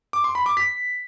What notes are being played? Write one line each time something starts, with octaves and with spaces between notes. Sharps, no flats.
D6
C6
B5
D6
B6